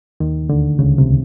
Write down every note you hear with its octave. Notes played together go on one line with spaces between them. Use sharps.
D#2 D#3
D2 D3
C#2 C#3
C2 C3